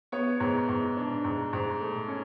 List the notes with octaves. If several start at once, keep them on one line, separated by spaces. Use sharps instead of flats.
B3 C#5
G#2
G#2
D4
G#2
G#2
A3
C#4